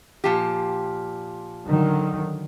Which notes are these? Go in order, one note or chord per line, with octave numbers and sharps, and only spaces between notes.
A#2 F3 G4
D3 D#3 F#3